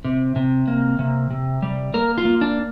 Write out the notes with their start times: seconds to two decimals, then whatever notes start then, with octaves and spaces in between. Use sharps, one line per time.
0.04 C3
0.36 C3
0.68 A#3
0.99 C3
1.30 C3
1.62 G3
1.94 A#3 A#4
2.18 F4
2.25 A#3
2.41 D4